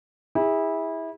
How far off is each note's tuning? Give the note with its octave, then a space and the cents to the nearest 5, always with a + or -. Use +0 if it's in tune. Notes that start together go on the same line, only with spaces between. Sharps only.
E4 -20 G#4 -35